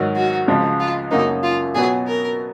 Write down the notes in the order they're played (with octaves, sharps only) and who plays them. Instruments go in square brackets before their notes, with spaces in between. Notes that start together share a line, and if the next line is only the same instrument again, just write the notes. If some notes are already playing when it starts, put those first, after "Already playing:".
Already playing: [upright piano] G#2 D#3 F#3
[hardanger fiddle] F#4
[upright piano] C#2 C#3 F3 G#3
[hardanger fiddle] F4
[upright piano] F#2 C#3 F#3 A#3 [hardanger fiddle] D#4
[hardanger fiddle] F4
[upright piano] B2 F#3 B3 [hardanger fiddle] G#4
[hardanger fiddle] A#4